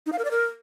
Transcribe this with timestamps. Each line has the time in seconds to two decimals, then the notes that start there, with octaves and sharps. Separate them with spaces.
0.06 D#4
0.12 F5
0.19 A#4
0.25 D5
0.31 A#4